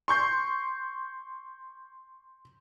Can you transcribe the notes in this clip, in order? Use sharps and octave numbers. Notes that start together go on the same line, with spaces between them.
C6 C#6 G6 C7